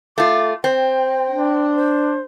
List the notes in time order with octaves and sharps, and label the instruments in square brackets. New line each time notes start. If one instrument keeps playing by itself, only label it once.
[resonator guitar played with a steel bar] A3 F4 [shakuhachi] D6
[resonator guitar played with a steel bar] C4 [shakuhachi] G5
[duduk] D4
[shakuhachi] C5